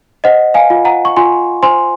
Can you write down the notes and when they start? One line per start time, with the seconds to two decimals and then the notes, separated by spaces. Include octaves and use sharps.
0.24 C5 D#5 F#5
0.54 F5 G#5
0.70 F4
0.85 F#5 A#5
1.05 C#6
1.16 F4 G#5 C6
1.63 C5 G#5 C6